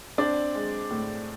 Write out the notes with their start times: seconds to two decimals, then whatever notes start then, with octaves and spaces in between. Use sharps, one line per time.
0.18 C4 D4 D5
0.55 G#3
0.90 A2